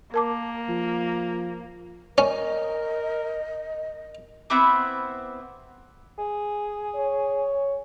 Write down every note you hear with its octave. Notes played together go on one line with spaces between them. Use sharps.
A#3 A#4 A5 D6
F3
C#4 A#4 D#5
B3 C4 E4 D6
G#4
C#5